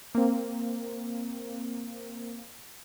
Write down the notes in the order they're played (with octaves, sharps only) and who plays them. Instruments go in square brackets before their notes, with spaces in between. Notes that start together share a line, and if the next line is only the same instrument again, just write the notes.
[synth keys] A#3 C4